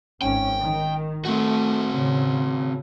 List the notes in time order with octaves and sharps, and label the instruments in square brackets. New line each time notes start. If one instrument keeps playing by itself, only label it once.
[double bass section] G#1 C#4 [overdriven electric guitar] G5
[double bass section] D#3
[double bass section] A3 [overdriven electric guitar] C4 F#4
[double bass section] A2 C#3